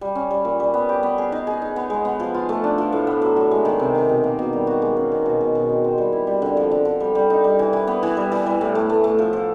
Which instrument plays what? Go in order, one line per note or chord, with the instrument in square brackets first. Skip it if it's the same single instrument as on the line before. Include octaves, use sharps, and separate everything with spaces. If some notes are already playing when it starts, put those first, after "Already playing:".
[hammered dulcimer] G3
C#4
G3
A#2
G3
B3
G4
B3
G#4
D#4
G#4
D#4
B3
G#3
B3
F3
F4
A3
D4
F3
A2
B3
F#3
F#3
G#3
D#3
C3
D#3
B2
A#3
B2
G3
F#4
G#3
C#4
D#3
B2
B2
B2
C4
C4
G3
E4
G3
D3
F3
D3
D3
G3
G3
D#4
G3
E3
E3
B3
E3
G3
E3
G3
A2
A3
A3
A3
F3
F3